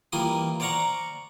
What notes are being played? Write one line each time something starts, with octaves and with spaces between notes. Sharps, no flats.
E3 G3 A#3 F4 C6 D#6
C5 D5 F5 F#5 A#5 C#6